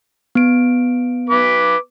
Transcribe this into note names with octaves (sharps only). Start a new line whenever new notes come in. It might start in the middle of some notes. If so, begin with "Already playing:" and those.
B3 D7
B4 D6